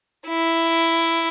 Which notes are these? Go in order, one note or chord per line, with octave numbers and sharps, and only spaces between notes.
E4